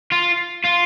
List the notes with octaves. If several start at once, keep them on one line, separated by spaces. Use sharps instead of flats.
F4
F4